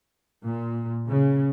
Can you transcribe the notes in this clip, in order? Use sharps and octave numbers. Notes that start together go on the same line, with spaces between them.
A#2
C#3